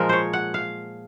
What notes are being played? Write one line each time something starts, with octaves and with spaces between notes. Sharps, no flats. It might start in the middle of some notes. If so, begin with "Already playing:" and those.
Already playing: A#2 F3 G#3 A#4
C5 C#5
F#5
F5